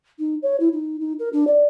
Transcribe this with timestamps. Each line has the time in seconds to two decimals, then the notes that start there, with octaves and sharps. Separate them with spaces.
0.19 D#4
0.42 C#5
0.60 E4
0.73 D#4
1.00 D#4
1.19 A#4
1.33 D4
1.47 D5